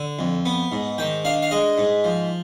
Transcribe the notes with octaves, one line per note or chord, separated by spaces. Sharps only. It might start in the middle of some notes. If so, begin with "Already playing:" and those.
Already playing: D3
F2
B3
G#2
D#3 G5
D4 F5
F5
G#3 D#5
G#2
F3